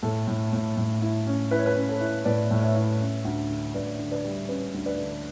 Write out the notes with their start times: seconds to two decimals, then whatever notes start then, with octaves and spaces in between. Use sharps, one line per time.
0.03 A2 A4
0.28 A2
0.53 A2
0.77 A2
1.02 E4
1.27 C#4
1.51 E4 B4
1.59 C#5
1.66 B4
1.76 C#4
1.89 A4 C#5
2.00 E4
2.25 A2 B4 D5
2.51 A2
2.62 C#5 E5
2.75 E4
3.00 C#4
3.25 D2
3.50 D3
3.74 D2 B4 D5
3.99 D3
4.11 B4 D5
4.24 G3
4.49 C#4 B4
4.74 D2
4.86 B4 D5
4.98 D3